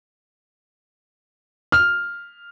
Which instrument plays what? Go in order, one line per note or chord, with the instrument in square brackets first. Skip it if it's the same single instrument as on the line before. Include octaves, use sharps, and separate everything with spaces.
[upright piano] F6